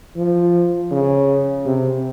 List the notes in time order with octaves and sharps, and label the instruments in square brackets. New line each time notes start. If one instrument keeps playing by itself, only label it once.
[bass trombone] F3
C#3
C3